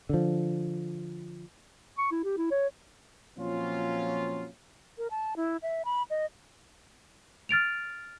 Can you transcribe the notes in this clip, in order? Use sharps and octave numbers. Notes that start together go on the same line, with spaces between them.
D3 F3
C#6
E4
G4
E4
C#5
A#2 F3 F#3 C4 C#4 F4
A#4
A5
E4
E5
B5
D#5
F6 A6 D7 F7